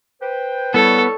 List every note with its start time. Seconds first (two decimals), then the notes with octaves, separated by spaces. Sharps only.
0.22 B4 C5 G5
0.74 G3 B3 E4 A4 C#5